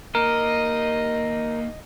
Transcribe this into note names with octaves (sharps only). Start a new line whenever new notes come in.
A#3 D#4 A#4 D#5